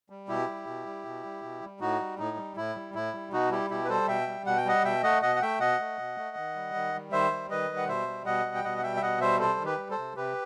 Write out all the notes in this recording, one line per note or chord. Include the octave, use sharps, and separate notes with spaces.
G3
B2 E4 G4
G3
B2
G3
B2
G3
B2
G3
A2 D#4 F#4
G3
A2 D#4
G3
A2 E4
G3
A2 E4
G3
B2 D#4 F#4
G3 E4 G4
B2 E4 G4
B4
G3 A4 C5
B2 E5 G5
G3
B2 F#5
G5
G3 D#5 F#5
B2 E5 G5
A3 D#5 F#5
B2 D#5 F#5
F#5
A3 E5 G5
B2 D#5 F#5
A3
B2
A3
D#3
G3
D#3
G3
D#3 C5 E5
G3
D#3 B4 D#5
G3
F#5
B2 C5 E5
G3
B2 D#5 F#5
G3
G5
B2 D#5 F#5
F#5
G3 E5 G5
E5
B2 D#5 F#5
G3 C5 E5
C3 A4 C5
D#3
G4 B4
G3
A4 C5
C3
C3 G4 B4